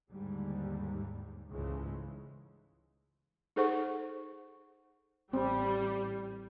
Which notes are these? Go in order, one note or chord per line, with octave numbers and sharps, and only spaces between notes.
D#2 G#2 D3 G3
C#2 G#2 C#3 E3 G#3 A3
D#4 G#4 A4 C5 F#5 C#6
A1 G3 C4